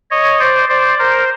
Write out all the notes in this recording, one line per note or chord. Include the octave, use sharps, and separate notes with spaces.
C#5 D#5
C5 D5
C5 D5
A#4 C5